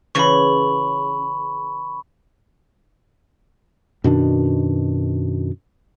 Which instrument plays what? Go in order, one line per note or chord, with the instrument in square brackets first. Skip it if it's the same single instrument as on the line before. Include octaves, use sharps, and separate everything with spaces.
[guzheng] C#3 E3 [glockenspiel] B5 C#6
[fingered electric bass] F#2 B2 D#3 D4